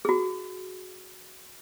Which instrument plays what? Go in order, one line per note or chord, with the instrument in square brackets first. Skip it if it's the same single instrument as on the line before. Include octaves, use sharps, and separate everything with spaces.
[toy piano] F#4 G#4